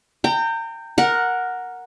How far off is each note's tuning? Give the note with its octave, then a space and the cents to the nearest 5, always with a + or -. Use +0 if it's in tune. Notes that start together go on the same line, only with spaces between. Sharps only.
G5 +0 A#5 -35
A#4 +0 F#5 -10